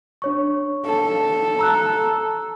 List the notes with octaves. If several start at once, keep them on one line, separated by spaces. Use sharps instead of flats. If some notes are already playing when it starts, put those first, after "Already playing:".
D4 C#5 C#6
A4
A#5 E6 F#6